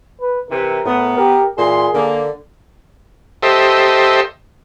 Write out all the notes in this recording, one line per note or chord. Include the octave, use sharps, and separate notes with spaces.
B4
C3 E3 A#4
A2 B3
G4 A#4
A#2 E3 G#4 C6
D3 A#3
G4 A4 C5 D#5 E5